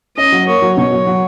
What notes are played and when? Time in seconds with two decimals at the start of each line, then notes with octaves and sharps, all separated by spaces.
0.17 C#4 D#5
0.32 F#3
0.48 A#3 C#5
0.62 F#3
0.77 B2 C#5
0.92 F#3
1.07 F#3